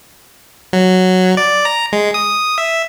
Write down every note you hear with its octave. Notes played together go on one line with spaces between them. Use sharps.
F#3
D5
A#5
G#3
D#6
E5